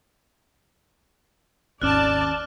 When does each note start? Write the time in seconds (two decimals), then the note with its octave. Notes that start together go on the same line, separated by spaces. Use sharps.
1.82 G#1 D#2 C#4 D5 A5 D6 F6 F#6